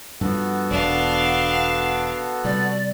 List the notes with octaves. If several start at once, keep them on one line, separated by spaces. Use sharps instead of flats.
G2 F3 B3 F#4 A4
E1 D4 F5
C3 G3 D5